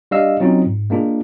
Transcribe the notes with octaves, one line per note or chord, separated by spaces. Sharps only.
G3 D4 D#5 F5 E6
F#3 C4 C#4 D#4 F4
G#2
G#3 A#3 D4 F4 G#4